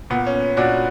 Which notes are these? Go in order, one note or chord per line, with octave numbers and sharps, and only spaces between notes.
A#2 B3
C#4
A#2 D4 F#4